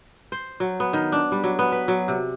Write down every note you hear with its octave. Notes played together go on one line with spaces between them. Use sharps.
C5
F#3
B3
D#3
D4
G3
F#3
B3
B4
F#3
C3